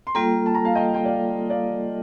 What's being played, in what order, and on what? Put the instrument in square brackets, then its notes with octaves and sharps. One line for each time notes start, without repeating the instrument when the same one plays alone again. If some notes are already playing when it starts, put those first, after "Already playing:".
[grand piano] C6
[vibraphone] G3 A#3 F4 A4 [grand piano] G5 A#5
[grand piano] A5
A#5
F5 A5
D#5 G5
G5
D5 F5
D5 F5